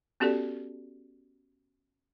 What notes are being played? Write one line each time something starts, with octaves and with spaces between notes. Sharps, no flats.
B3 C#4 F#4 G4 A4 D5